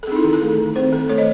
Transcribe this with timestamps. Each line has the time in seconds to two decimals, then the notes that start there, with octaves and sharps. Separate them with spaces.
0.03 A4
0.07 C4 D#4 G#4
0.16 E4
0.24 D#3 G#4
0.33 A4
0.42 A3
0.58 D#3
0.76 C4 C5
0.92 D#3 A4
1.09 A3 C#5
1.18 D#5